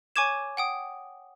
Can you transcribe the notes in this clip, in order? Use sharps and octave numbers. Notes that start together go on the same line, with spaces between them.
C#5 G#5 C#6 D6 G#6 E7
F#5 G5 D#6